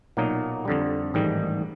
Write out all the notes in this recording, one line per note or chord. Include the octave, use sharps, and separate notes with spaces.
B1 A#2 F#3 A#3 D#4
F2 D3 G3
A1 G#2 D#3 G3